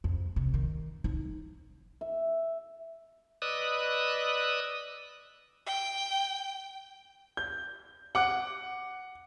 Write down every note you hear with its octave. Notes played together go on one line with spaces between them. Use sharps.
F2
C3
D#3
D#4
E5
B4 D5 D#5 D#6 E6 F#6
G5
G6
F#5 D6 F#6